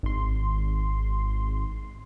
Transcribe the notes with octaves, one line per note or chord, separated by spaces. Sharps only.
G#1 C6